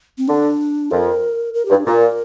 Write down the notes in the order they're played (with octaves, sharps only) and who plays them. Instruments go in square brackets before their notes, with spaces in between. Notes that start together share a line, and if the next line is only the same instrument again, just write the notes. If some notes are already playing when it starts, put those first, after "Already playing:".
[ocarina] C4
[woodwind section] D3 [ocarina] D4
[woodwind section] F2 [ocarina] A#4
[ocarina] A#4
[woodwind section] G2 [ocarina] G4
[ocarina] D4
[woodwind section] A#2 [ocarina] A#4